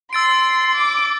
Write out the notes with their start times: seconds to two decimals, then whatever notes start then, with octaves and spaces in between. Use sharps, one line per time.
0.12 C6 E6 A6 D7
0.75 D6